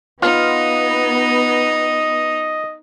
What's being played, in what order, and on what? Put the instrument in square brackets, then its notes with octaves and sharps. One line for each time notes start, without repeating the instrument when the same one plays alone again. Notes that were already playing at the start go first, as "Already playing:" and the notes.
[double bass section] B3 [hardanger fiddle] D#4 [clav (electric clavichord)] F4 [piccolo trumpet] D#5